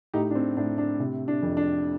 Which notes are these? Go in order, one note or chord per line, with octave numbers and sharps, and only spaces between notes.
A2 D#4 G4
D4
C4
A2 D4
D4
C3
D4
F2
D4